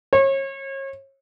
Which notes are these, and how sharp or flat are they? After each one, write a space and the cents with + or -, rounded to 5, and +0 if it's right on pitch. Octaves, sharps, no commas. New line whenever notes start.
C#5 -35